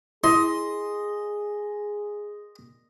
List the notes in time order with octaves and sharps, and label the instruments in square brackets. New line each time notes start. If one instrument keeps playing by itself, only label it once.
[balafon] E4 [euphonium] G#4 [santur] D#5 [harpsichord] C6